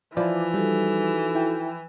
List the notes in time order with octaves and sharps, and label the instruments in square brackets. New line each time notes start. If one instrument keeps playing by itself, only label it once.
[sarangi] E3 [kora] F3 E4 [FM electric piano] D5
[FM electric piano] G3 [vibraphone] D#4 F#4 A4
[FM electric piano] E4 G5